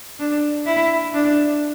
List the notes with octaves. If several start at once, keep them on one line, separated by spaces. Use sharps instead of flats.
D4
E4
D4